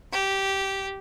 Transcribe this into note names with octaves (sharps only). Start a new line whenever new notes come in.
G4